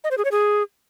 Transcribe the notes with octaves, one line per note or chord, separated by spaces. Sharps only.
D#5
C5
G#4
C#5
G#4